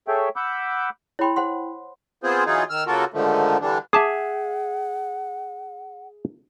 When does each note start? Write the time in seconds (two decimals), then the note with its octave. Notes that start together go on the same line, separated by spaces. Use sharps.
0.08 G#4 A4 C#5 E5 G5
0.36 F#5 B5 D6 E6 G6
1.19 E4 C#5 G5 B5 C6
1.36 C5 F#5 C6
2.24 B3 C4 F4 G#4 C5
2.46 E3 F#3 D#4 F4 G#4
2.70 D#3 E6 F6
2.87 C#3 A#3 F4 F#4 A4 A#4
3.13 G#2 D3 D#3 F3 A3
3.61 D3 E3 G3 D4
3.93 G#4 E5 F#5 A5 D6 D#6